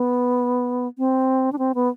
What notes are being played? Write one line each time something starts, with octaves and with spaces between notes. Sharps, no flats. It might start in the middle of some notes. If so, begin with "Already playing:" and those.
Already playing: B3
C4
D4
C4
B3